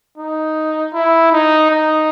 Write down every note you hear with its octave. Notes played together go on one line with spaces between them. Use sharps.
D#4
E4
D#4
D#4